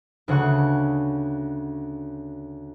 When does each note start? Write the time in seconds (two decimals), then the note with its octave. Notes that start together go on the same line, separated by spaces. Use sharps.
0.28 D2 C#3 F#5 C#6 F#6